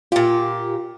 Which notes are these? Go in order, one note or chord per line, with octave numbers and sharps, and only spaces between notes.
A#2 F4 G4